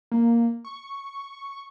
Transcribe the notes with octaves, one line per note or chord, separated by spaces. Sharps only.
A#3
C#6